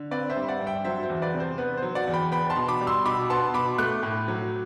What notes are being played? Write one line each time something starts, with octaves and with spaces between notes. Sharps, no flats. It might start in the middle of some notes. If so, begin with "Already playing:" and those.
Already playing: D3
C4 B4 D5
C5 E5
G3
D5 F#5
G2
E5 G5
F#3 C5 E5
C5
E2
B4 D5
C3
C5
B3 B4
C5
F#3
D5 F#5
E2
G5 B5
B3 G5 B5
A5 C6
B2
B5 D6
G3
C6 E6
B2 B5 D6
B3 A5 C6
B2 B5 D6
A3 D6 F#6
A2
F#3